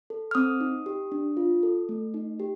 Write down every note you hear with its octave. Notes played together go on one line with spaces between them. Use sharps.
A4
F6
C4 D#6
D#4
G4
D4
F4
A4
A3
D#4
G4